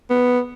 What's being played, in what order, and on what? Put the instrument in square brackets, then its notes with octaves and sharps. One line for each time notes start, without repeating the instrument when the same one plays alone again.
[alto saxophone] B3